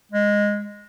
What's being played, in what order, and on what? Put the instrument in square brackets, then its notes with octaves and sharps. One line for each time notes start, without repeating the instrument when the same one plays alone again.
[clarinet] G#3